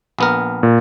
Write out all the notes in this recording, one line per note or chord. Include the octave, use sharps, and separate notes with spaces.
A#1 B3 A#4
A#2